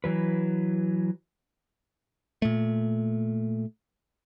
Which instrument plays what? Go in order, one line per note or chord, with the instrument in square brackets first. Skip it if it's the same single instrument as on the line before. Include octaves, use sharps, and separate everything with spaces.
[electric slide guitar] E3 F#3 B4
[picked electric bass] A#2 A3